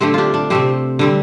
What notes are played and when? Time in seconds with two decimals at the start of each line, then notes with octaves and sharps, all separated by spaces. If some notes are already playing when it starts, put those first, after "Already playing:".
0.01 D3 A3 C4 G4 C5
0.14 D4 F4 G4
0.34 D4
0.50 C3 A3 C4 G4 C5
0.99 D3 G3 C4